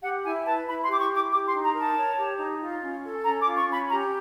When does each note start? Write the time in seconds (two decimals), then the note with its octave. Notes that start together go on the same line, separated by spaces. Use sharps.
0.02 G4 F#5
0.24 E4 G#5
0.45 B4 A5
0.67 E4 B5
0.84 C6
0.89 G4 D6
0.99 C#6
1.10 E4
1.15 D6
1.31 G4 D6
1.48 C6
1.53 D#4
1.64 A#5
1.74 A#4
1.80 A5
1.96 C#5
2.18 G4
2.38 D#4
2.60 F4
2.82 C#4
3.03 A4
3.25 C#4 A#5
3.41 D6
3.46 F4
3.57 C#6
3.68 C#4 B5
3.89 G4 A#5